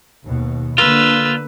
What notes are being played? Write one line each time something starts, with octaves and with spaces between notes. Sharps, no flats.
D#2 B2
D3 A#3 F4 B4 E6